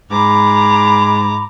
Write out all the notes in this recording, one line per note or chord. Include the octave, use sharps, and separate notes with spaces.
G#2 A#5 B5 D6